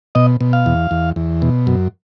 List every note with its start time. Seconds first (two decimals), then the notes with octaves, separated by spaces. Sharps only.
0.15 B2 D#5
0.41 B2
0.53 F5
0.66 E2
0.91 E2
1.16 E2
1.42 B2
1.67 F#2